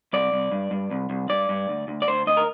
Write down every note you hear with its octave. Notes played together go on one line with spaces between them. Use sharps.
C2 D5
C2
G2
G2
C2
C2
G2 D5
G2
D2
D2
D5
D2 C5
D2 D#5
A#4